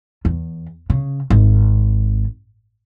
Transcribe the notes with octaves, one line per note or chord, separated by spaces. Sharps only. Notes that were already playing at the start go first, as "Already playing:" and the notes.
E2
C#3
G#1